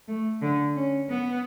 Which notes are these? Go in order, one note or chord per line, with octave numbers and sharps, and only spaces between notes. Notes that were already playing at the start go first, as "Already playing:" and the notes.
A3
D3
C#4
B3